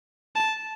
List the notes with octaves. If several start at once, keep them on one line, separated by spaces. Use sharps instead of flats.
A5